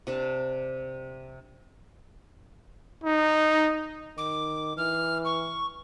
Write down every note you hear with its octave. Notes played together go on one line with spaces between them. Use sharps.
C3 D4 A5
D#4
D#3 D6
E3 F6
C#6